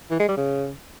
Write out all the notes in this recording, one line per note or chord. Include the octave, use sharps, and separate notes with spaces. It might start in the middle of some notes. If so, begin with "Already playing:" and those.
E3
G#3
G3
C#3